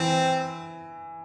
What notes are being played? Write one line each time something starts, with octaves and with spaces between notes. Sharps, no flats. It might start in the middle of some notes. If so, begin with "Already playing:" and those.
Already playing: E3 C4